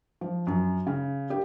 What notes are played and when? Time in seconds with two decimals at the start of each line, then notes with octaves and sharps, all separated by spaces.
0.21 F3
0.47 F#2
0.87 C#3
1.30 G4